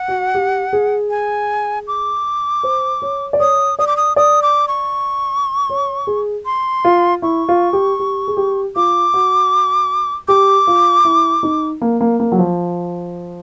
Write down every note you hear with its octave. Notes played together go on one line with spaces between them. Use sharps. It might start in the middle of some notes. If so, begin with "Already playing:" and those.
Already playing: F#5
F#4
G4
G#4
G#5
D6
C5
C#5
D5
C#5 D#6
D5 D#6
D6
D#6
D5 D#6
D6
C#6
C#5
G#4
C6
F4
E4 C#6
F4
G4
G4
G#4
G4
F4 D6
F#4
G4 D6
F4
E4
D#4
A#3
A#3
A#3
F#3
F3